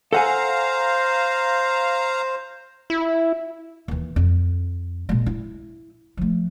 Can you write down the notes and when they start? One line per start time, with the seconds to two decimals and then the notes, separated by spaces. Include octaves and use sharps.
0.13 A4 C5 F5 F#5 G#5 A#5
2.90 E4
3.88 D#2 E3
4.16 F2
5.09 A#2 G#3
5.26 E4
6.17 F3 A3